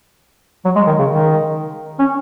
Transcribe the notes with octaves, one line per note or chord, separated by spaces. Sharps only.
F#3
G#3
D#3
C#3
D#3
C#4